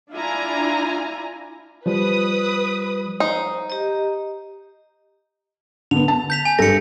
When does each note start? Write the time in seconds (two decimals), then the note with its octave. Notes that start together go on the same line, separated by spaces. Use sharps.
0.13 D4 E4 F4 G#5 A#5
1.86 F3 G3 B4 D#6
3.20 D#4 C5
3.70 G4 D#5
5.91 D3 B3 F7
6.08 A5
6.30 G6 B6 F7
6.45 G#5
6.59 G2 A4 A#6 C#7